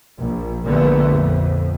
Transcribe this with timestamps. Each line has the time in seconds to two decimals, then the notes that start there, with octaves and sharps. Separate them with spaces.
0.19 A#1
0.66 A#1 A#2 D3 A3 B3
1.08 F2